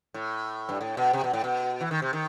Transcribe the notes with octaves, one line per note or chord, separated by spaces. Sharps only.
A2
G2
A2
B2
C3
B2
A2
B2
E3
D#3
C3
D#3